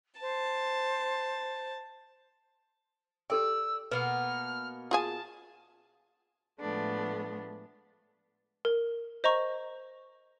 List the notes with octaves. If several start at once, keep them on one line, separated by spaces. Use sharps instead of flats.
C5 A5
G4 A4 D5 G5 E6
B2 A#3 B3 B4 F6
F4 G#4 G#5 A5
A2 F3 G#3 A3 B3 D4
A#4
C5 D#5 A#5 C#6